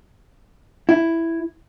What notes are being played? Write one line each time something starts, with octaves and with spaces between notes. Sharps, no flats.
E4